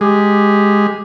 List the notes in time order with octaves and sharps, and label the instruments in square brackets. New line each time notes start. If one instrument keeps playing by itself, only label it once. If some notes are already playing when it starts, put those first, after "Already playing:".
[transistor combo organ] G#3 [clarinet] G4